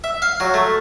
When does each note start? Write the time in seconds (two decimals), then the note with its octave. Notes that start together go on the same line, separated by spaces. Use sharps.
0.04 E5
0.22 F5
0.40 F#3
0.54 A3